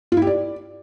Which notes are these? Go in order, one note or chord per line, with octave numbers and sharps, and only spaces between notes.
F4
E4
G4
D5